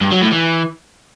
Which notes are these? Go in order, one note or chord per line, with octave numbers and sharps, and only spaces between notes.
G2
F#3
A2
E3